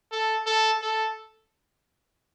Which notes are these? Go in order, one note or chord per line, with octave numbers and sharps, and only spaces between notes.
A4
A4
A4